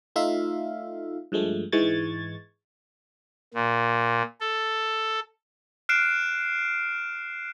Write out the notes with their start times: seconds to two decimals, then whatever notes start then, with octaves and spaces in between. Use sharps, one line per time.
0.16 A3 D#4 F4 E5 F5
1.32 G2 F3 G#3 A3
1.72 G#2 E3 G#3 C#6 G#6 A6
3.54 A#2
4.40 A4
5.89 F6 F#6 C7 D7 E7